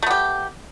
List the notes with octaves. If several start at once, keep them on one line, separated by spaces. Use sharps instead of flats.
A3 B3 G4